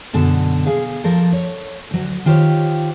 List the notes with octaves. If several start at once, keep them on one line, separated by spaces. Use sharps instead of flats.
F#2 B2 D3 A4
G#4 F5
F3 A4 A#4
C#5
D2 F#3
D#3 F4 G4 C5 C#5